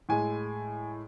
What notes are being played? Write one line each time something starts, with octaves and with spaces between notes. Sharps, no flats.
A2 G#3 G#5